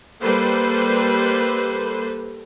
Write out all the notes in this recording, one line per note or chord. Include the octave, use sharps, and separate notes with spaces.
G3 A#3 A4 B4 C5